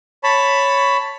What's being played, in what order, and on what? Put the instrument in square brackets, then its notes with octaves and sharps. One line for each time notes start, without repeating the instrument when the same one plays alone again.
[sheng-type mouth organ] C#5 A5 B5